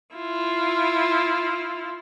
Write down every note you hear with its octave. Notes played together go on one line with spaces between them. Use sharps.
E4 F4